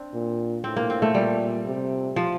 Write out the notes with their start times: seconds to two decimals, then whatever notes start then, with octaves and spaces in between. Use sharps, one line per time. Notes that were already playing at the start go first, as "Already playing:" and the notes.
Already playing: C4 D4
0.14 A#2
0.64 A2 C4
0.76 A#3
0.90 C4
1.02 A3
1.15 A#2 G3
1.66 C3
2.16 F3